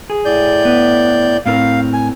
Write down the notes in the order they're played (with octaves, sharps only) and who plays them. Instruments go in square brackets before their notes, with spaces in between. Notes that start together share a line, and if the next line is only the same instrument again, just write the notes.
[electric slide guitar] G#4
[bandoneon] A2 D5 G6
[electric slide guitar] B3
[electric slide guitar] A2 C4 A#4 [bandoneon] F5
[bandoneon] G#5